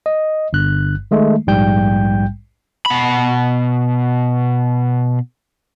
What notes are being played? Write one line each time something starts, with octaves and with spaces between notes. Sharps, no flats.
D#5
G1 G2 F#6
D#3 G#3 A3
A#1 G#2 G3 G5 G6
B2 B5